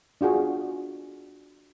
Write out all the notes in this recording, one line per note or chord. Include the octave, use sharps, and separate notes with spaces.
D4 F4 F#4 G#4